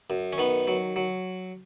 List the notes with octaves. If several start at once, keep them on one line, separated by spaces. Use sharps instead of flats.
F#2
C#4
D#3 B3
F#3
F#3